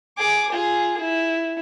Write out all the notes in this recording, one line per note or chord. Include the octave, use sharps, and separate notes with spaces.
G#4 D6
F4 G#4
E4